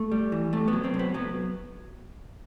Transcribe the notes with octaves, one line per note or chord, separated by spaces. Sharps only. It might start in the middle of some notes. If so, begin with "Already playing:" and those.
Already playing: A3
G3
E3
C3 A3
B3
F#3
C3 C4
C3
B3
F#3 B3